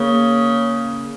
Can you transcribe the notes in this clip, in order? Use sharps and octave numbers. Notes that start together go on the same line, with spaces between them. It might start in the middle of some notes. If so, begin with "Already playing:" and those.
Already playing: C#3 A#3